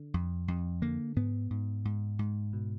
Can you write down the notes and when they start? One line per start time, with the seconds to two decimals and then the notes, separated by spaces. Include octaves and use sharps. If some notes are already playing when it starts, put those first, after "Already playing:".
Already playing: D3
0.14 F2
0.48 F2
0.82 D3 A#3
1.16 G#2 B3
1.50 G#2
1.85 G#2
2.19 G#2
2.53 B2